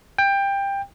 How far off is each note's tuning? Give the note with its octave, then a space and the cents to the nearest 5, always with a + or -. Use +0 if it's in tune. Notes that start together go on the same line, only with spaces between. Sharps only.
G5 +20